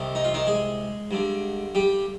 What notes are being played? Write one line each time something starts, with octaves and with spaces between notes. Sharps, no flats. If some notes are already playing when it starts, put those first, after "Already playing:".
Already playing: C2 C3 D#3
D#4
F4
D#3 D#4
G#3 G#4
G2 D3
G3 G4